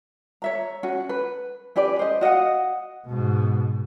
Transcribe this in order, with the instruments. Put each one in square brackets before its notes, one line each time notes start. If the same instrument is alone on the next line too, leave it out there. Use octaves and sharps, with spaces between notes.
[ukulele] C#5 E5 A#5
C#4 F#4
B4
C#4 G4 B4 D5
C5 D#5
F#4 D#5 F5 F#5
[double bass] G#2 B2